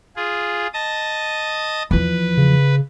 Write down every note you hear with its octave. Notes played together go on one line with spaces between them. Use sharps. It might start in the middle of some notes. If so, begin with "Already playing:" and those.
F4 G#4
D#5 A5 D#6
E2 F3 B4
C#3